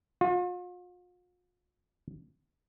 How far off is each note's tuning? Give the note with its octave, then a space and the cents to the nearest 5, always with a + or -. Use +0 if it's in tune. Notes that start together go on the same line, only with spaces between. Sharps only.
F4 +45